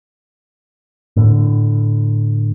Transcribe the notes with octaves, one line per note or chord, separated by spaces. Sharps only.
A2 D3